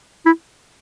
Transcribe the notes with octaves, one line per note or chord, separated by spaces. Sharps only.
E4